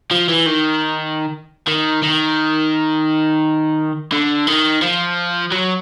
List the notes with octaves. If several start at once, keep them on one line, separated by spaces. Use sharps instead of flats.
F3
E3
D#3
D#3
D#3
D3
D#3
F3
F#3